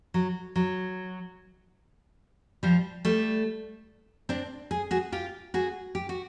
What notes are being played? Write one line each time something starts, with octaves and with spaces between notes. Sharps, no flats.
F#3
F#3
F3 G3
G3 A3
C4 D4
G#4
F#4 G#4
F4 G4
F#4 G#4
G4
F#4